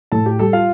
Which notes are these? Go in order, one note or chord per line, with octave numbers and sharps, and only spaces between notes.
A2 A4 A5
G4 G5
G3 A4 A5
F4 F5